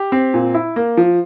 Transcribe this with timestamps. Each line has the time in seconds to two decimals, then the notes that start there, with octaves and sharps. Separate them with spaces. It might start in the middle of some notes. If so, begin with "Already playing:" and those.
Already playing: G4
0.12 C4
0.34 A#2
0.54 E4
0.76 A#3
0.97 F3